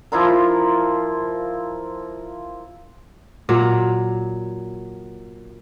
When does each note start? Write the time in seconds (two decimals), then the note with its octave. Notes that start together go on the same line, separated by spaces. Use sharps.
0.12 F3 E4 F4 A#4
3.49 A#2 F#3